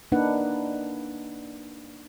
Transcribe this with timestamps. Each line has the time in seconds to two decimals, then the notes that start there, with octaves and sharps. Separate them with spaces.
0.12 A#3 D4 D#4 B4 F#5